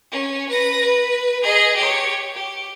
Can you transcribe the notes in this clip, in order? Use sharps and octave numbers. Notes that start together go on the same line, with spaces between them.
C#4
B4 A#6
B4
G#4 D#5
G4 C#5
G4